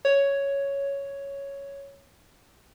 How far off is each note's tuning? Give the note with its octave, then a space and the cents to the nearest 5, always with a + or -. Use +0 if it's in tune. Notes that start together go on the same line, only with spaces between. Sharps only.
C#5 +5